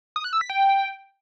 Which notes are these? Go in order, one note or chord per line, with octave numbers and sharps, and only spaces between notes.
D#6
F#6
E6
B6
G5